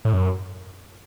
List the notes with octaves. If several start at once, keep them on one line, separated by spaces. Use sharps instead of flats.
A2
F#2